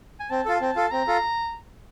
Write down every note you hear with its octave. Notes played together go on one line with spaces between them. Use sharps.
G#5
C4 A5
F4 A4
C4
F4 A4
C4 A#5
F4 A4